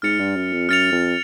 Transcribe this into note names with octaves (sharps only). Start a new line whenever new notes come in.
G#2 F6 A6 C#7 F7
G2
F#2
F2
F#2 F6 A6 C#7 F7
F2